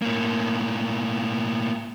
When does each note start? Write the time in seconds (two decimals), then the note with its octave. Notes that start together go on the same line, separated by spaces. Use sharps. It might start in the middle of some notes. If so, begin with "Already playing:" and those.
0.02 A2 A#3